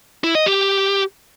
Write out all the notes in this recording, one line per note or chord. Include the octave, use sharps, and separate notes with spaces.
E4
D#5
G4